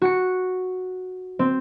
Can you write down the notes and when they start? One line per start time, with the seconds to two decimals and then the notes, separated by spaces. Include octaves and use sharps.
0.02 F#4 C#7
1.39 C4